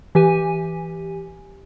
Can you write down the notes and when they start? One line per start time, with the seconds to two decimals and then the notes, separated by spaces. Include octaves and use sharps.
0.15 E3 G4 G#5 D#7